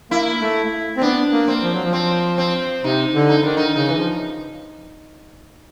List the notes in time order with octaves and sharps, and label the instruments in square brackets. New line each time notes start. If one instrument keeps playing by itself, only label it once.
[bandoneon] A#3 [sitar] E4
[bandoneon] A3
C4
[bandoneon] B3 [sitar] D4
[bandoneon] A#3
[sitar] C4
[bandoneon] F3
F#3
F3
[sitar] C4
C4
[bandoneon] C3 [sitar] D#4
[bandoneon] D3
[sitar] D#4
[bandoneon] D#3 [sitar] D4
[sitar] D#4
[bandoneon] C#3 [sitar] D#4
[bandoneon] E3
F3